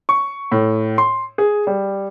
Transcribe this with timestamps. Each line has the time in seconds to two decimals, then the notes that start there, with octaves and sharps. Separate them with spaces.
0.09 C#6
0.52 A2
0.98 C6
1.38 G#4
1.67 G3